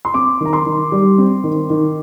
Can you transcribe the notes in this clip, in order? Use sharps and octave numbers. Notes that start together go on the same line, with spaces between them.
C6
C4 D6
D#3 A#5
C6
D#3
G3
C4
D#3
D#3